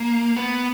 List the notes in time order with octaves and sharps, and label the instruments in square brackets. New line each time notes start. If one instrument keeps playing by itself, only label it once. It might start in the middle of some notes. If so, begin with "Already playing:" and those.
Already playing: [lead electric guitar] A#3
B3